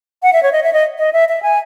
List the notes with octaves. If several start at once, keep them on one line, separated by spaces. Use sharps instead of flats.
F#5
E5
C#5
D#5
E5
D#5
D#5
E5
E5
G#5